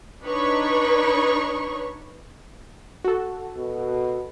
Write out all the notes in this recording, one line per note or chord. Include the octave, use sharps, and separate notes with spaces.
D4 D#4 B4 C#5 B5 C#6
F#4 A4
B2